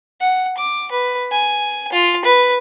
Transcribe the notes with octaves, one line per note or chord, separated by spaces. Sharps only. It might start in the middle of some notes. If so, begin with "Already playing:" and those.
F#5
D6
B4
G#5
F4
B4